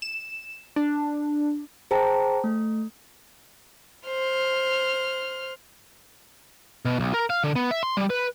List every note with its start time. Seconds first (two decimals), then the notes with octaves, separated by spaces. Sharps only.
0.02 E7
0.76 D4
1.91 G#4 C5 G5 A5 A#5
2.44 A3
4.07 C5 F6
6.85 B2
7.00 B1
7.14 A#4
7.30 F5
7.44 D3
7.56 B3
7.71 E5
7.83 C6
7.97 G3
8.10 B4